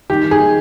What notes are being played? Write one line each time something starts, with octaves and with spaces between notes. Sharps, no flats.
D#3 G4
D#3
G#4
D#3